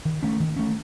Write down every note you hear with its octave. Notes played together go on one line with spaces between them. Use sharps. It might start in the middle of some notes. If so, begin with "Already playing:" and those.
D#3
A3 C#4
D#3
A3 C#4